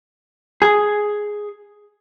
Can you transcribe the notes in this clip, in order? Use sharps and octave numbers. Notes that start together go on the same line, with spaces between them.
G#4